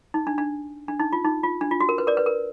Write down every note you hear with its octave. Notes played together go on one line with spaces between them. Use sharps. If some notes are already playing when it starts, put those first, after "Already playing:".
D#4
D4
D4
D4
D#4
F4
D#4
F4
D4
F4
F#4
A#4
B4
A#4 D5
B4
A#4